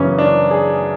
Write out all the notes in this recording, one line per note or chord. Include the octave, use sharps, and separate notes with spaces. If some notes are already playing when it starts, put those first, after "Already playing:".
Already playing: F#2 C#3 E3 B3 C#4
D4
G#4